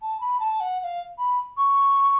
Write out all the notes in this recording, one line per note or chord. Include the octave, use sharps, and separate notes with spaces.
A5
B5
A5
F#5
F#5
F5
B5
C#6